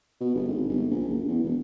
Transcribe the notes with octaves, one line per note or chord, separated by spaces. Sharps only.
B2
G1
G#1
G1
A#1
F#1
E2
E1